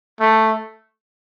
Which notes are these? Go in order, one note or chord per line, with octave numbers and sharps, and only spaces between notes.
A3